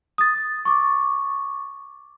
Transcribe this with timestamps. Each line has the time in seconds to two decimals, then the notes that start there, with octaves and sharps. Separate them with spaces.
0.18 D#6 A6
0.65 C#6 D6